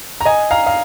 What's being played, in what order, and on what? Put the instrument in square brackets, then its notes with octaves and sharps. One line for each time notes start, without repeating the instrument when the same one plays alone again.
[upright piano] A#5
D#5 G#5
F5 A#5
F5